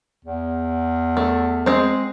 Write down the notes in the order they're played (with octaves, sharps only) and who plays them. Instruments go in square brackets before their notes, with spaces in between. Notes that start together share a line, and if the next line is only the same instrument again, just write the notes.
[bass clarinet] E2
[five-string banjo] A3
G#3 C4